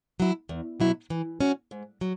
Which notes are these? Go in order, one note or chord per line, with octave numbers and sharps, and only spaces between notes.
F#3 E4
E2
B2 F#3 E4
E3
C#4 F#4
G#2
F#3